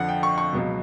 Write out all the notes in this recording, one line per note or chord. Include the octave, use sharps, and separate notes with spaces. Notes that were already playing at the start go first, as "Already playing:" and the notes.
Already playing: F2 D3 F3 F#5
G5
C#6
C#6
C#2 B2 F#3